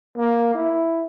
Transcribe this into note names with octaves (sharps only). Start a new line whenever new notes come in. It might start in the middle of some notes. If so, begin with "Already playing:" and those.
A#3
E4